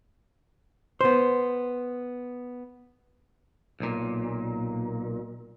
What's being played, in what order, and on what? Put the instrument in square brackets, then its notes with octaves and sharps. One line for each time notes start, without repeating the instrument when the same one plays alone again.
[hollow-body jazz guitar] B3 C5
[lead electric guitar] B1 A#2